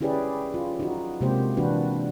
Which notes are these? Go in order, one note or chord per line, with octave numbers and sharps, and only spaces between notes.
C#4 E4 G4 G#4 B4 D5
F4
D#4 F#4
C3 G#3 A#3 G4 C5
E3 D4 F#4 B4